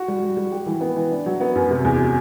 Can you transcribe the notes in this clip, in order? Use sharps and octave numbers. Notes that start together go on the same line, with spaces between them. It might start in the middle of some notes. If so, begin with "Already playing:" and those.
Already playing: F#4
G3
G3
G3
G4
E3
B3
E3
D4
F#3
B3
F#2
C3
E2